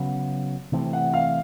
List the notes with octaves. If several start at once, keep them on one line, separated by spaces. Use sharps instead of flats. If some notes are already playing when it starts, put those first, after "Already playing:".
Already playing: C#3 F#3 B3
C3 E3 A3 C4
F#5
F5